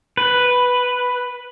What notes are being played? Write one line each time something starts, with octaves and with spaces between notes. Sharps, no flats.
B4